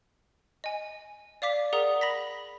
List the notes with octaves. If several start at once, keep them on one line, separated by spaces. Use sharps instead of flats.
D#5 G#5
D5 F5 D6 B6
G#4 A#4 D5 F#5 A#5 D#6
B5 A#6 B6